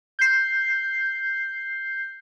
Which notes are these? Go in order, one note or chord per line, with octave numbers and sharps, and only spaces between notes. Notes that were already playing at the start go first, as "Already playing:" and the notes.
G6 C7